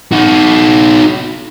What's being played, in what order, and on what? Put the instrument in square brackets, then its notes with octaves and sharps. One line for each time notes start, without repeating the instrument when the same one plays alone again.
[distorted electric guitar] D#4 F#4